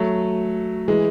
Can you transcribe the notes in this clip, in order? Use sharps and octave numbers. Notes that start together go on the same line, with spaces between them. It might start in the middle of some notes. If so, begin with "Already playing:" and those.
Already playing: F#3 A3
E3 G#3